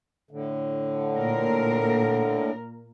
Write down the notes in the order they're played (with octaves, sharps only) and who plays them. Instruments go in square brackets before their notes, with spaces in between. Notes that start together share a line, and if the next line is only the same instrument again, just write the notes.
[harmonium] A2 D3
[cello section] A#2 A#4